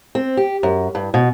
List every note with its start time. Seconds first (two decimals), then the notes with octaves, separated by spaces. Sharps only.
0.15 C4
0.37 G4
0.63 F#2
0.95 G2
1.14 B2